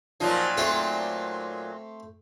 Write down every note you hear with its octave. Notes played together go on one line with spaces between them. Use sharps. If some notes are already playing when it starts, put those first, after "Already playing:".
A#2 F3 F#3 D#4
A3 C4 G4